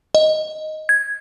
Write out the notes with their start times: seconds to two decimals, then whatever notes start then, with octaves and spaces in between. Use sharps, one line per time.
0.15 D#5
0.89 G#6